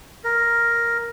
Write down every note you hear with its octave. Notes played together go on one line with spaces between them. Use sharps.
A#4